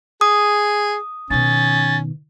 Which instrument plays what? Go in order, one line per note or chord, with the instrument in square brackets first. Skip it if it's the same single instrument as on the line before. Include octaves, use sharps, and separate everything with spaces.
[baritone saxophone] G#4 [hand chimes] D#6
[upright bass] B2 D#3 [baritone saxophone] C#4 [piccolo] A6